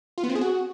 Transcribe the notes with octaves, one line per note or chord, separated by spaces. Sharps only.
F4
B3
C4
G#4
F#4